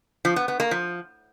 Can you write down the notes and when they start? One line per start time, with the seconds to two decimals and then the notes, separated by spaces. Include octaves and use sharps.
0.25 F3
0.36 B3
0.48 B3
0.60 A#3
0.71 F3